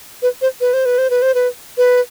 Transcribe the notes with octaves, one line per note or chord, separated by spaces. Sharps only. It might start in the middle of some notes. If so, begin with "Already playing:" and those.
B4
C5
B4
C5
B4
C5
B4
C5
B4
B4